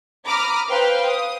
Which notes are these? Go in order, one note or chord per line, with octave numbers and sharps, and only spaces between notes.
A#5 B5 D6 D#6 F6
B4 C5 F5 G5 F6
D#6